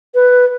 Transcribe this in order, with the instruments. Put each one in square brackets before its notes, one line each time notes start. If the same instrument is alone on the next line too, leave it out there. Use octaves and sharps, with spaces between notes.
[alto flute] B4